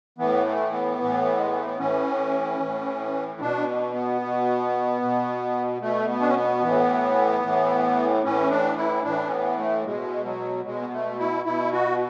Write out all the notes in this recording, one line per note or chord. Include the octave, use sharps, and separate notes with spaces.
A2 E3 B3
A3
B3
E3
A2
G#3
A3
B3
A2 E3 C#4
E3
A2
B2 D4
B3
B2
B2
B2 A3
B3
D4
C#4
B3
A2 E3
A2 E3
A2 E3 C#4
D4
E4
A2 E3 D4
C#4
B3
A3
B2 G#3
F#3
B2 G#3
B3
A3
E4
B2 E4
F#4